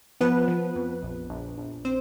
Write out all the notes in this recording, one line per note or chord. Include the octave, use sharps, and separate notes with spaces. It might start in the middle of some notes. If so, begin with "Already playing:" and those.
F3 B3 B4
F3
F2
A#1
A#1
A#1
C4 C5